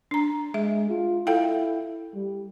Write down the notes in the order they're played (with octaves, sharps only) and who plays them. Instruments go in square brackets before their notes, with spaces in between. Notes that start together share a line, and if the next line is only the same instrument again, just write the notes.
[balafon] D4 A#5
[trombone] G#3 [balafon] E5
[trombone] F4
[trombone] E4 [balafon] A4 F5 G5
[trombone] G3